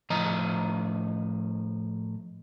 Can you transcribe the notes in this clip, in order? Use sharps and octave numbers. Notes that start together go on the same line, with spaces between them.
A2 F3 D#5 A#5